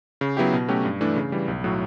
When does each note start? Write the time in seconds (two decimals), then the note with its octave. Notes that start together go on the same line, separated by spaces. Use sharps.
0.21 C#3
0.37 F#3 B3 E4 G4
0.53 B2
0.68 F#3 A3 C#4 G4
0.85 G2
1.01 E3 A3 D4
1.16 C#3
1.32 E3 G3
1.48 B1
1.64 A2 F#3